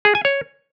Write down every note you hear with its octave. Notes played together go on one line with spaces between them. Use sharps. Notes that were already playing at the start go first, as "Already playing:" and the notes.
G#4
G#5
C#5